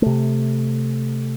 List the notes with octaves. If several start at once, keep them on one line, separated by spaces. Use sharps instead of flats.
C3 A3